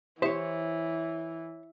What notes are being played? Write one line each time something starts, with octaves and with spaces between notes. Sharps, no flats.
E3 E4 G4 C5 C#5 E5